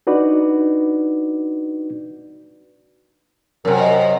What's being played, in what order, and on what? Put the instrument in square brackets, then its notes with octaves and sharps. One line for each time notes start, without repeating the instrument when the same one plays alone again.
[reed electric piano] D4 D#4 F#4 B4 D5
[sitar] F#2 C3 [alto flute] A#4
[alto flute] D#5